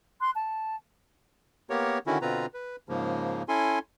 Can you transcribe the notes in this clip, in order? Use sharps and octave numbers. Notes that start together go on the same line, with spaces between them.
C6 F#6
A5
A#3 B3 G4 A#4 C#5
D3 D#3 C#4 E4 F#4
B2 D3 C4 F4 B4 A#5
B4
G#2 C#3 F3 A#3
C#4 E4 A4 G#5 C6